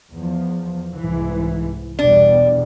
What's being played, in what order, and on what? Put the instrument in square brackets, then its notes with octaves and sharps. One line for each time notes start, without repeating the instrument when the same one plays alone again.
[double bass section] E2 F3
C2 G#2 E3
[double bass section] E2 B2 G3 [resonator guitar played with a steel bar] D4